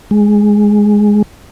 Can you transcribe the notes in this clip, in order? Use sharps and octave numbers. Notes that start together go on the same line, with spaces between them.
G#3